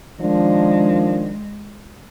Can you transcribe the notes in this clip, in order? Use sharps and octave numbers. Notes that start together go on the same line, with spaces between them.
D#3 F3 G#3 D4